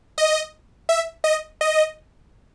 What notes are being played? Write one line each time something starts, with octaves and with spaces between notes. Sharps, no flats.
D#5
E5
D#5
D#5